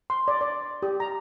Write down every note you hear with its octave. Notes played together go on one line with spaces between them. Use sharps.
C6
D5
D5
G4
A#5